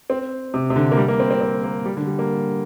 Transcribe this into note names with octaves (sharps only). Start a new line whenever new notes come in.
C4
C3
C3
D3
A#3
G3
A#3
C4
C4
C4
A#3
G3
D3
G3
A#3